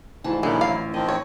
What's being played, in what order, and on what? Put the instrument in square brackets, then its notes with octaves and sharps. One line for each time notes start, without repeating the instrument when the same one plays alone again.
[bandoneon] D2 G#2 [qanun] E3 F3 A5
[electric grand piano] A#2 D3 D#3 [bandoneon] F#3 E4 [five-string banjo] G#3
[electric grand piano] A1 [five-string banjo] F5
[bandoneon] D#3 F3 C4 [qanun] D#5
[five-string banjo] C#5